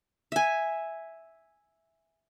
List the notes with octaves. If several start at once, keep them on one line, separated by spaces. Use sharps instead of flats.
E5 G#5